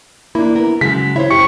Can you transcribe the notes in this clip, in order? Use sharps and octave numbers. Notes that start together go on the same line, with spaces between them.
A#3 D4 E4
B3 A#4
C#3 F#3 G#3 B6
E4 C5 C#5 E5
F#2 G4 C#6 C#7